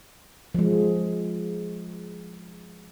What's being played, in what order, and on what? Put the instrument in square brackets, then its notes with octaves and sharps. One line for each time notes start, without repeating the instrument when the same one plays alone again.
[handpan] F3 G#3